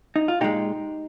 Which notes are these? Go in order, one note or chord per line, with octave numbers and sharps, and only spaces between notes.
D#4
F4
A#2 G#3 D#4 G4